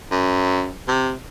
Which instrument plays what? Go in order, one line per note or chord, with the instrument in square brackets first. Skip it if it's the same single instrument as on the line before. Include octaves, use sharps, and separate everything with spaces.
[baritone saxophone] F#2
C3